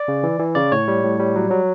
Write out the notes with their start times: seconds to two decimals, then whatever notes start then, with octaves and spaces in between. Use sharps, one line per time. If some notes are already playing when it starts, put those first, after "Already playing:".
Already playing: D5
0.08 C#3
0.23 E3
0.39 E3
0.55 C#3 D5
0.72 A2 C#5
0.88 G3
1.04 A2
1.20 G3
1.36 F#3
1.51 F#3